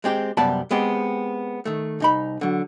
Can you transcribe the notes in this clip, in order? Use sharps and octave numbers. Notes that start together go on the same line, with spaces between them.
G#3 C4 G4
F#2 C3 G3 B3 D5 A5
G#3 B3 C4 G4
D#3 A3
C2 D#4 B5
D3 F#3